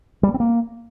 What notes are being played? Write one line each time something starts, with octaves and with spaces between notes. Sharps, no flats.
G3
A3
C4
A#3